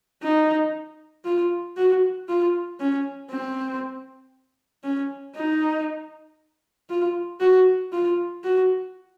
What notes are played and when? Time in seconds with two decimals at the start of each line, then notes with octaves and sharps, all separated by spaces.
0.23 D#4
1.25 F4
1.77 F#4
2.28 F4
2.80 C#4
3.31 C4
4.84 C#4
5.36 D#4
6.90 F4
7.40 F#4
7.92 F4
8.44 F#4